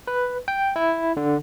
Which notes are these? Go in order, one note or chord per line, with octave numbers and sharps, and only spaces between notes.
B4
G5
E4
D3